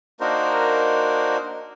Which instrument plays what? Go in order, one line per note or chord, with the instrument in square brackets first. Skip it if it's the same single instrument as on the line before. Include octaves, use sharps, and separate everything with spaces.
[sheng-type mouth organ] A#3 D4 D#4 F#4 A#4 C5